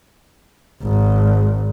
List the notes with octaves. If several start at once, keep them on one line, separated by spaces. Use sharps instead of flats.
G#1